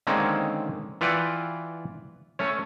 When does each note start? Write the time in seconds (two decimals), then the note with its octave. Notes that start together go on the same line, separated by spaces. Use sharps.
0.07 D3 D#3 G#3 A#3 C4 C#4
1.01 E3 F4 B4 D5 F#5 G5
2.39 A3 C#4 C#5